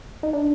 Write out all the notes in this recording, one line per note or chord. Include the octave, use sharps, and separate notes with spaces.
D#4
D4